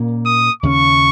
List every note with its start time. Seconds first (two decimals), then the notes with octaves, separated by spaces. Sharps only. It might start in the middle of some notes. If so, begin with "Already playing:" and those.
Already playing: A#2 A#3 C#4
0.26 D#6
0.62 D#2 C#3 A#3 C#4 C#6